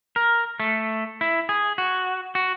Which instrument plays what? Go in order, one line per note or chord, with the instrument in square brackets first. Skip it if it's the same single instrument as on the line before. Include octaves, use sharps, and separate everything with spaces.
[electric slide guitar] A#4
A3
E4
G#4
F#4
F#4